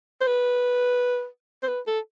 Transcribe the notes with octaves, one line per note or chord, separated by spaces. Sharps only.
C5
B4
C5
B4
A4